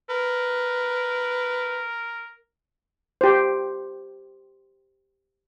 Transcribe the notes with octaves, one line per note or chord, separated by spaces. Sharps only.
A#4 B4
G4 C5